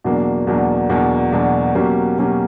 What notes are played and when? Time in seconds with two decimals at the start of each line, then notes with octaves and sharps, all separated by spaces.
0.04 E2 B2 F#3 A#3 D4
0.47 E2 B2 F#3 A#3 D4
0.89 E2 B2 F#3 A#3 D4
1.32 E2 B2 F#3 A#3 D4
1.75 B2 F#3 A#3 C#4 G4
2.19 B2 F#3 A#3 C#4 G4